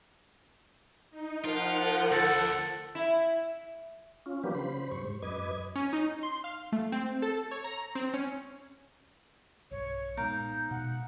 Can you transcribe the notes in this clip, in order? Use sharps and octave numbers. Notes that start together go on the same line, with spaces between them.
D#4
F3 F4 A#4 F#5
D2 A4
E4
C#4 F4
F3 F#3 A#3 D4 G4 B4
C#3 C5 B5
G2 C5 C#6
G#2
F#2 B4 D#5 D6 G#6
C#4
D#4
C6
F5
A3
C4
A4
C#5
A#5
C4
C#4
B1 G2 C#5
A#2 G#3 B3 D#4 A#4 F5 G6
B2 F#5